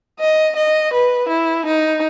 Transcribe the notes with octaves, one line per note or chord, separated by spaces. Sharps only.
D#5
D#5
B4
E4
D#4